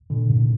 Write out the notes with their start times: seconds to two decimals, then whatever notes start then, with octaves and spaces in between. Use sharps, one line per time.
0.10 A#2 D3
0.30 G#2 C3